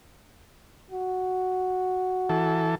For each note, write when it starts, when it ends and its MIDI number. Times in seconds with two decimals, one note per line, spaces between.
0.91 2.77 66
2.29 2.75 52
2.29 2.75 69